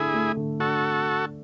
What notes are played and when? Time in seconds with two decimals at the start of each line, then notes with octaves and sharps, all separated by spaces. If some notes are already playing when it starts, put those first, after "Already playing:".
Already playing: D3 A3 D4 E4 G#4 A4
0.14 A3
0.37 D3
0.60 D4 F#4 A4